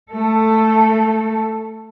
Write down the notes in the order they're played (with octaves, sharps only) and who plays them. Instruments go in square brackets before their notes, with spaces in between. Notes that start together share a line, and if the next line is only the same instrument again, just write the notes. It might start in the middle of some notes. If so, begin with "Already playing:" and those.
[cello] A3 A4